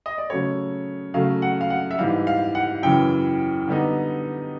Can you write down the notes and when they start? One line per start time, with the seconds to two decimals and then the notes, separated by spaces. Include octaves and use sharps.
0.06 D#5
0.18 D5
0.30 C#3 F#3 A3 C#5
1.14 C#3 F#3 A3 F5
1.42 F#5
1.61 F5
1.70 F#5
1.91 E5
1.99 G#2 E3 G3 F5
2.27 F5
2.55 F#5
2.83 F#2 C#3 E3 G5
3.68 D3 G3 B3 D#4